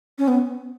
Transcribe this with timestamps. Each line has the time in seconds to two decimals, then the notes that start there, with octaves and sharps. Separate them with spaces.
0.18 C#4
0.28 B3